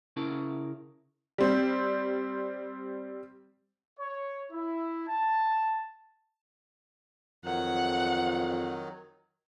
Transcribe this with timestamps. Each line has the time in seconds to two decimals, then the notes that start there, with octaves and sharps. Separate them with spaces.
0.17 C#3 C#4 E4 A#4 A5
1.38 G3 C4
3.99 C#5
4.51 E4
5.08 A5
7.45 F2 D#3 F#3 F#5